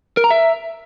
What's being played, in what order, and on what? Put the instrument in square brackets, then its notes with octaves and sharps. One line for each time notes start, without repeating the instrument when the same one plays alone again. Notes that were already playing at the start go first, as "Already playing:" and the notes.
[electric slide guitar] A#4
A#5
E5